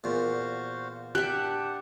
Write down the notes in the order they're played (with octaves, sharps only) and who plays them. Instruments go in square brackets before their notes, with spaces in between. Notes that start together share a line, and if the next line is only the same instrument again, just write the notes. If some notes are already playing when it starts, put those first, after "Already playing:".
[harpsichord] E2 A#2 [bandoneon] F#4 C5 F5
[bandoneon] D4 F#5 A5 [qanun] G4 E5 [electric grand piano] F#6